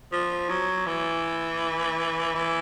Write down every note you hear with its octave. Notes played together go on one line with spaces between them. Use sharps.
F3
F#3
E3
E3